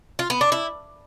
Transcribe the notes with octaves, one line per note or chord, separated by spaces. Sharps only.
F4
B3
D4
E4